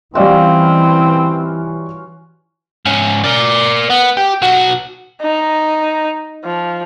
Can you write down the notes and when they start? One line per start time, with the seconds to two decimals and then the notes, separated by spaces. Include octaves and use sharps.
0.15 E3 G3 C4 C#4 F4 F#4 D5 D#5
2.85 G#2 C#4
3.24 A#4 D5
3.90 B3
4.17 G4
4.42 B1 F#4
5.22 D#4
6.45 F3